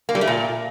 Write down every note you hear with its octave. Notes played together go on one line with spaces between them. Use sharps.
A#3
G3
A3
A#2